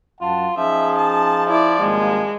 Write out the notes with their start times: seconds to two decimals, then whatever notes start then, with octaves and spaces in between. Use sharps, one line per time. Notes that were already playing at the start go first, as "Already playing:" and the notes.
0.21 F#2 F4 F#5 A5
0.57 F3 C#4 D#4 G#4 E5
0.98 A5
1.47 E4 D5
1.80 G#1 G3 G#3 A#3